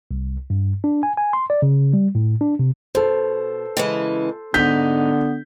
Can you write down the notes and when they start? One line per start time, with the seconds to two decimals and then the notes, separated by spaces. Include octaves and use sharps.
0.11 C2
0.50 G2
0.84 D4
1.03 G#5
1.17 G#5
1.33 C6
1.50 D5
1.62 C#3
1.93 G3
2.15 A2
2.41 D4
2.59 C3
2.95 B2 A4 C5
3.77 C#3 E3 G#3
4.54 G#2 D3 G#3 B3 D#4 G6 B6